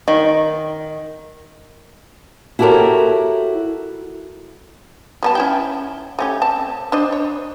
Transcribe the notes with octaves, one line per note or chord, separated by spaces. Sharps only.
D#3
E4 F#4 G4 A4 A#4 C#5
G3 B3 A5
C#4 E4 G5
A3 C#4 G4
C4 A5
D4 C5 D#5
C#5